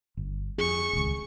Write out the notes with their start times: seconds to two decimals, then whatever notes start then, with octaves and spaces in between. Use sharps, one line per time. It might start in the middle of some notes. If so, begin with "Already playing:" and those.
0.17 G1
0.58 F2 G#4 C#6
0.93 D#1 C#2